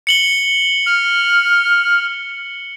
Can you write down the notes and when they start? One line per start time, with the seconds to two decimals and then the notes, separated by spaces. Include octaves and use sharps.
0.07 C#7 F#7 G7
0.86 F6